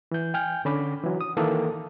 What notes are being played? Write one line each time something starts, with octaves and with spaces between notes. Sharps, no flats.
E3 G6
G5 G#5 F6 G6
D3 C#4 B5 D6
E3 F#3
D#6
D#3 E3 A#3 A4 F5 D6